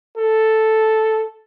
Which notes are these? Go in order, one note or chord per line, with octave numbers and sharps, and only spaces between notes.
A4